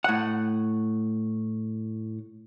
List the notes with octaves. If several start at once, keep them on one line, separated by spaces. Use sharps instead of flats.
A2 F#5